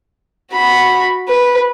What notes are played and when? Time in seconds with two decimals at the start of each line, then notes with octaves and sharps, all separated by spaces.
0.52 F#4 B5
1.29 B4